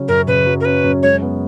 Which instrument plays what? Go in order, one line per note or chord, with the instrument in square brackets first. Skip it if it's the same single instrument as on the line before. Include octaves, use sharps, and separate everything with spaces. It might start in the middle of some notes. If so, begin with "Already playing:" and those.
Already playing: [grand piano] C#3 F#3 C#4
[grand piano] F#2 [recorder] A#4
[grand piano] C#3 [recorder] B4
[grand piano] F#3
[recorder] A#4
[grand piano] C#4 [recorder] B4
[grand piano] F#2
[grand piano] G#3 [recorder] C#5
[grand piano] B3